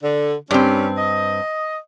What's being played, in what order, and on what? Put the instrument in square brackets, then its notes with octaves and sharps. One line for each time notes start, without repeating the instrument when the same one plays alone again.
[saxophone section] D3
[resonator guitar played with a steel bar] G2 C4 [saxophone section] G3 C#4
[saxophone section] D#5